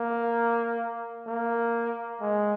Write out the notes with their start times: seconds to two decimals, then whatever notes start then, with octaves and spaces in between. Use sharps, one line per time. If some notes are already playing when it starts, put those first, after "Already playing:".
Already playing: A#3
1.27 A#3
2.21 G#3